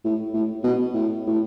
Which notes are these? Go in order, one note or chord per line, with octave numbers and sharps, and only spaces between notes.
A2
A2
B2
A2
A2